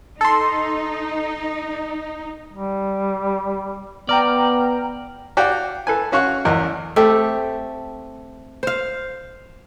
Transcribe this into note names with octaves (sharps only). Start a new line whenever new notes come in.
D#4 A4 C6
G3
B3 D5 G5 A#5 F6
F#4 G4 D5 F5 G5
A4 B4 G#5
C#4 F#4 F5 C#6 F#6
A1 E2 A#4 D#5 F#6
A3 C4 G4 A4
C5 F5